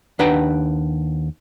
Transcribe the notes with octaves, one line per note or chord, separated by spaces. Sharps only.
D#2 D4 B4 F#5 G5 A#5